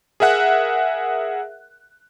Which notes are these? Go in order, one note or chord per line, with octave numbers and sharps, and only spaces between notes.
G#4 A#4 E5 F#5 F#6